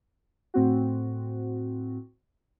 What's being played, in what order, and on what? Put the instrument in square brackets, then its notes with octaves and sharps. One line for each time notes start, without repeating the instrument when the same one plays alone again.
[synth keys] A2 C4 F#4